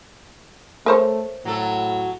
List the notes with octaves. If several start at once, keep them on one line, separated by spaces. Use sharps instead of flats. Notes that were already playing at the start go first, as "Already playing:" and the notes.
A3 A#4 C5 C#5
A2 F#3 A4